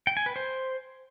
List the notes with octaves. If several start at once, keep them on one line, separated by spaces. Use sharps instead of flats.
G5
G#5
B4
C5